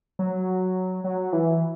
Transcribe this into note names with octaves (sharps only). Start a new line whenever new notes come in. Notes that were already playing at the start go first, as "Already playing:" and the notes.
F#3
F#3
E3